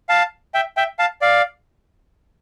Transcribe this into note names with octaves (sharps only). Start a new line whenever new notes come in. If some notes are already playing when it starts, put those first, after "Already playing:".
F5 A5
E5 G5
E5 G5
F5 A5
D5 F5